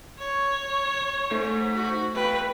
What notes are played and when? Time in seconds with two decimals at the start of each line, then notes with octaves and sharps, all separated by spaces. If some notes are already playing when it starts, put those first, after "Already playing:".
0.19 C#5
1.31 A3 D#4 C5
1.75 F#4
2.15 E2 B4 G5